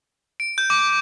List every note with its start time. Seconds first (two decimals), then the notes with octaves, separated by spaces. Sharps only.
0.40 D7
0.58 G6
0.70 D6